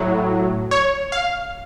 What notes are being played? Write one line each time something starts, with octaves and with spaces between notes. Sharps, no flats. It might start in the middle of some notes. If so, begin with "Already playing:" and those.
Already playing: A2 F#3
C#5
F5